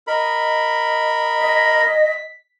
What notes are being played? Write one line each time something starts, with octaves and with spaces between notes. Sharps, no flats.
A#4 D#5 B5
D#5 B6